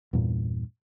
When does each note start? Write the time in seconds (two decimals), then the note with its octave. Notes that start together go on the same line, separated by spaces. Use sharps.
0.13 E2 G2 A#2